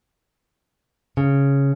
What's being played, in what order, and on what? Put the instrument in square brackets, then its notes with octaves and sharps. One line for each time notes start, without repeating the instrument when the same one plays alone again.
[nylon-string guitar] C#3